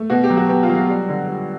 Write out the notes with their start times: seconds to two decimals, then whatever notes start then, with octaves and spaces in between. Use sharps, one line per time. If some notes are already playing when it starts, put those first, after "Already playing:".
Already playing: A3
0.10 B2 F#4
0.24 G4
0.30 F#3
0.37 F#4
0.49 B2 G4
0.63 F4
0.69 F#3
0.75 F#4
0.89 G3
1.09 D3
1.28 G3